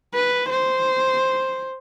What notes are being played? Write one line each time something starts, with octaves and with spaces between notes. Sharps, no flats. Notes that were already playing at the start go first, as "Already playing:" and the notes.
B4
C5